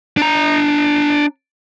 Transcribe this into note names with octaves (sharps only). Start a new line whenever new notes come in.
D4 A#5